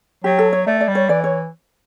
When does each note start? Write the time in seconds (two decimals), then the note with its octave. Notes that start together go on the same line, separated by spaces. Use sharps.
0.24 F#3 G4
0.39 A4
0.53 C#5
0.67 A3 D5
0.81 D5
0.88 G3
0.95 C#5
1.09 E3 D5
1.24 C#5